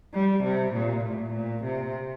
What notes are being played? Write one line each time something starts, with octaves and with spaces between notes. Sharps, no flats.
G3
C3
A#2
A2
A#2
C3